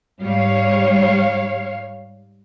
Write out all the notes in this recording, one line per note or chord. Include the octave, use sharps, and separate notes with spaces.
G#2 G3 C#5 F5